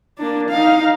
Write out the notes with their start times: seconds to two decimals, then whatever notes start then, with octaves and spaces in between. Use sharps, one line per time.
0.18 A#3 D4
0.49 D#4 F5